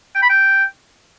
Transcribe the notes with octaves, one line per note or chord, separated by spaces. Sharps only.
G5
B5
G5